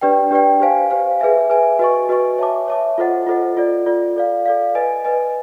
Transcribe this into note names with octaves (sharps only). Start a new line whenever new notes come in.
D4 G4 B4 D5 G5
D4 G4 B4 D5 G5
G4 C5 F5 G#5
G4 C5 F5 G#5
G#4 B4 E5 G#5
G#4 B4 E5 G#5
F#4 B4 D#5 G#5 C#6
F#4 B4 D#5 G#5 C#6
C#5 E5 A5 D6
C#5 E5 A5 D6
F4 A4 C5 D#5 F#5
F4 A4 C5 D#5 F#5
F4 A4 D5
F4 A4 D5
A4 D5 F5
A4 D5 F5
B4 D#5 G#5
B4 D#5 G#5